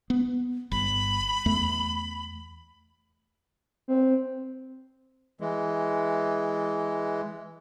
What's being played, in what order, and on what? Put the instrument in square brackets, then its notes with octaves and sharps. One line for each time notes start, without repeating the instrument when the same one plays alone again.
[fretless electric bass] B3
[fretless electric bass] G1 [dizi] B5
[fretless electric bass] E2 A3
[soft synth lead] C4
[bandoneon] E3 G#3